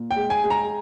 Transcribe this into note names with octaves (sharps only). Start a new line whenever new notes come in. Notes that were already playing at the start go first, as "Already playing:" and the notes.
Already playing: A#2
G5
G#3
G#5
G#3
A#5